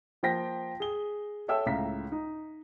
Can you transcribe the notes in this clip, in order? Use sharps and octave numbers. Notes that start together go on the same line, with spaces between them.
F3 A#3 C5 G5 A#6 B6
G#4 G7
A4 C#5 E5 G5 E6
C#2 A2 E5 F5 A#5 B6
D#4